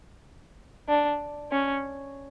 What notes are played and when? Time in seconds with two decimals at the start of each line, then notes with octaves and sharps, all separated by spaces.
0.88 D4
1.51 C#4